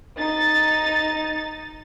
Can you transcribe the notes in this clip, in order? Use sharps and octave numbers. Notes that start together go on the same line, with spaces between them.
D#4 A6